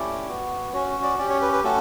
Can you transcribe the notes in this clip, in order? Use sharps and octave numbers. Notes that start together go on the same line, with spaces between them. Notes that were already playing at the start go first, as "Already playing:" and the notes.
Already playing: A3 C#4 E4 G4 D5
B3 F#4
C#4 F#4 C#5
D5
C#4 G4 D5
C#5
B4
B4
A3 C#4 F#4 A4